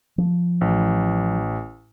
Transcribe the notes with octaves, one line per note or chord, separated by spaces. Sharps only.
F3
A1